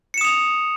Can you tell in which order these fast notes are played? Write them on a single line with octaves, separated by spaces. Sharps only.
C#7 E7 D#6 F7